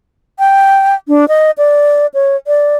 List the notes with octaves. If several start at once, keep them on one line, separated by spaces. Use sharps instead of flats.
G5
D4
D#5
D5
C#5
D5